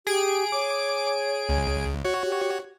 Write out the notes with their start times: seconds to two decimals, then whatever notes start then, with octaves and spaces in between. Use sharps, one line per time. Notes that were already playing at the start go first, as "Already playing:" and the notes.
0.07 G4 G#4 D7
0.52 C#5 D6
1.49 C#2
2.05 F#4 C#5
2.24 G4